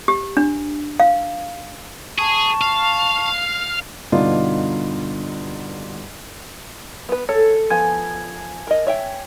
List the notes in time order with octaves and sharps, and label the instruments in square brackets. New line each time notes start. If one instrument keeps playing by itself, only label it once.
[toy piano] G4
D4
F5
[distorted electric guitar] G#4 [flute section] A5 C#6
[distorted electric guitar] F5
[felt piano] G2 B2 D3 D4 D#4 F4
[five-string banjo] B3 B4
[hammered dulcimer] A4 [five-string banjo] C#5
[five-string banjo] F3 B3 [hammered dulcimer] G#5
[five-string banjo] A#4 D#5
C#5 E5 G5